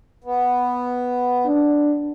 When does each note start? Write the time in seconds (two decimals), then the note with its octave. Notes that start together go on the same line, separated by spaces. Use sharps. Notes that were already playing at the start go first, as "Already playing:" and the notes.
0.24 B3
1.47 D4